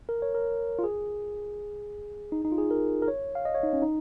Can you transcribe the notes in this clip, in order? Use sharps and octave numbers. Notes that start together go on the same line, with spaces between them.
A#4
C#5
A#4
F4
G#4
D#4
D#4
F4
G#4
A#4
A#4
C#5
F5
D#5
C#5
D#4
C#4
D#4